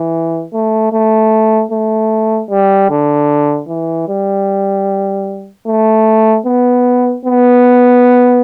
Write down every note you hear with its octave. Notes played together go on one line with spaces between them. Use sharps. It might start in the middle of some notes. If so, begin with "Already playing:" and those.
Already playing: E3
A3
A3
A3
G3
D3
E3
G3
A3
B3
B3